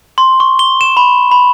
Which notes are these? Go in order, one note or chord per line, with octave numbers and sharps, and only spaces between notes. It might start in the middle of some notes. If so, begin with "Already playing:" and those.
C6
C#6
G7
E7
B5
B5